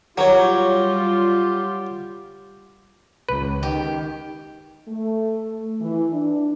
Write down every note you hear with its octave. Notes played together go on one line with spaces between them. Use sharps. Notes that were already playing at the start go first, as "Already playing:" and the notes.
F#3 G3 F4 G4 A#4 C#5
C#2 B4
D#3 G4
A3
E3
D4